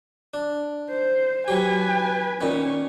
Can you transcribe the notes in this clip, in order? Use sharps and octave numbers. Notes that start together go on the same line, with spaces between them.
D4
C5
F#3 G4 B4 G#5
A#2 D#3 B3 C#4